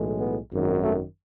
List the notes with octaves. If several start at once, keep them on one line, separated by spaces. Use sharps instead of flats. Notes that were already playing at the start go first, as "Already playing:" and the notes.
Already playing: B1 A2 E3 G#3
B3
G#1 F#2 D#3
A3